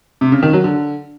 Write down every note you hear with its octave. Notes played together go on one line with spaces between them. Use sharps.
C3
C#3
D#3
F#3
D3